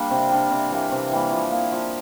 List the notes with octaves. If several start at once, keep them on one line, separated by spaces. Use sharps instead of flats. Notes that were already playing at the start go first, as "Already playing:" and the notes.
Already playing: G3 A#3 D4
C3
G3 D4
C3
E3 G3 A#3
C3
E3 G3 A#3
F3
A#3 E4
F3